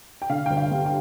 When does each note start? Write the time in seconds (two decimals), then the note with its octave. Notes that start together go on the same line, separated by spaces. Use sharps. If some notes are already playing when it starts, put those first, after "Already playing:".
0.22 G5
0.30 D3 F5
0.46 G1 G5
0.57 F5
0.71 G2
0.86 G5